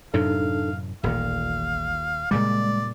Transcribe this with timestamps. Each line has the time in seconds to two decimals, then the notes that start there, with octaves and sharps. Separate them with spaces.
0.14 F#2 A2 C3 D4 D#4 A4 F5
1.04 D#1 A1 A#2 D#3 F5
2.31 A#2 C#3 G3 G#3 D5